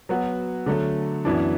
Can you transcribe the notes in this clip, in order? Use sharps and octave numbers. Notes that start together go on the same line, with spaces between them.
F#3 B3 F#4
D3 F#3 A3
F#2 E3 B3 D4